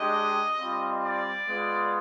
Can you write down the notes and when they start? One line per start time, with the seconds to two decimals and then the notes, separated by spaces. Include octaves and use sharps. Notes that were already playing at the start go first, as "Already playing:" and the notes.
Already playing: G#3 D4 G4 D#5
0.57 G3 C4 F4
1.01 D5
1.47 G#3 B3 F4